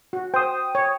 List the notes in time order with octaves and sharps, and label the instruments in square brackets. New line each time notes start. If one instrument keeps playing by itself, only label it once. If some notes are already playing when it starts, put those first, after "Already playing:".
[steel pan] F#4
[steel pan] C5 [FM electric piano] G5 D#6
[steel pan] C#5